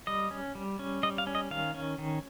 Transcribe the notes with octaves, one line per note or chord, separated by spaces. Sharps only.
G3 D#5
C#4
G3
C#4
G3 D#5
F5
C#4
D#5
D#3 F5
C#4
D#3